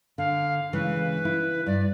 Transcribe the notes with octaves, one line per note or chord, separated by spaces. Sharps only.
D3 F5
C#3 E3 G#3 B4
E4
G2 D5